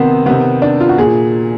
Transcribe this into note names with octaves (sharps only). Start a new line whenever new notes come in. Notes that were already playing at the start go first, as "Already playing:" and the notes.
Already playing: C3 D#3 B3 C4
C3 D#3 B3
D4
F4
F#4
A#2 G#4